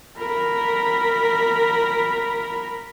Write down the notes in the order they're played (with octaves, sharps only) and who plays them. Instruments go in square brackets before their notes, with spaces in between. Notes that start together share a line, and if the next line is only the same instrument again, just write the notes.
[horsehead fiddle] A#4 B5